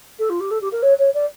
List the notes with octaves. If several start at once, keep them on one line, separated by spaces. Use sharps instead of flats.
A4
F4
G4
A4
G4
A#4
C#5
C#5
D5